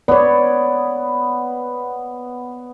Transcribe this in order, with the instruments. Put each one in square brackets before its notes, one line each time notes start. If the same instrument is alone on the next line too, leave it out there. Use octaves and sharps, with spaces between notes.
[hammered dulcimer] B3 [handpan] C#5 D5